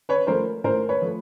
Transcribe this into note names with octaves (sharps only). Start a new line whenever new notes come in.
B4 C#5
F3 A3 A#4 C5
A2 A#4 C5
B4 C#5
F3 A3